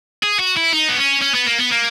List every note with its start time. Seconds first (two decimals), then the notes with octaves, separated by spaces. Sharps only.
0.23 G#4
0.39 F#4
0.57 E4
0.72 D#4
0.89 B3
0.97 C#4
1.22 C#4
1.34 B3
1.46 A#3
1.58 B3
1.71 A#3